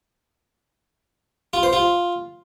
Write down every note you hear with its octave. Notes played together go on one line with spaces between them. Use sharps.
F4
C5
F4